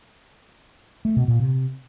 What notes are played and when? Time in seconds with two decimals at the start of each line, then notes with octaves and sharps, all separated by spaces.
1.05 A3
1.16 B2
1.28 A#2
1.40 C3